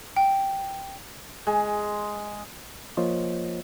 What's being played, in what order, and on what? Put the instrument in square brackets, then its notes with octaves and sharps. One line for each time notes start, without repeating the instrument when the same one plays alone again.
[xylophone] G5
[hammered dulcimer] G#3
[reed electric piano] F3 A#3 F4 C5 C#5 D#5